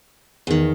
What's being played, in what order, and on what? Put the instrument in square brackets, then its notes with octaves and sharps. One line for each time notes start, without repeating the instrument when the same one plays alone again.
[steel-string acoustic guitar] E2 D#3